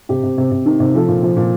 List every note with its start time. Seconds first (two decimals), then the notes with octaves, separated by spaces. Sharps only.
0.09 C3 G4
0.23 C3
0.38 C3
0.51 C3
0.66 D#3
0.80 C3
0.95 F3 A4
1.08 A#2
1.23 F3
1.37 A#2